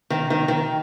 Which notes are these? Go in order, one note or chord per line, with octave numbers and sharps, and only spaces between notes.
D#3
D#3
D#3